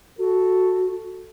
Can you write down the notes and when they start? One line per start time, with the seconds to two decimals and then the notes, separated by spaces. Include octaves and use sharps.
0.19 F#4 A4